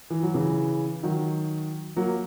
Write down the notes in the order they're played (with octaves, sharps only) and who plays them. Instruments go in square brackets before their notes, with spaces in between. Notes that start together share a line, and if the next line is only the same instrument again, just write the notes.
[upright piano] E3
F#3
C#3 E3
D#3 F#3
F#3 A#3